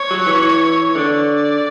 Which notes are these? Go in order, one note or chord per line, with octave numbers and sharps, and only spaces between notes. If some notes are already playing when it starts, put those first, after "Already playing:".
Already playing: C#5
F#3
E3
D3 D5